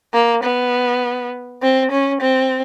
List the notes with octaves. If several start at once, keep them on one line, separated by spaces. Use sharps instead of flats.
A#3
B3
C4
C#4
C4